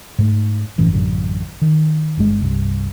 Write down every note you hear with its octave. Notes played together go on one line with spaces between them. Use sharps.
G#2 A3
F1 F#2 A2 E3
A1 F#2 D3
D#3
G1 G2 G#3
C2 G2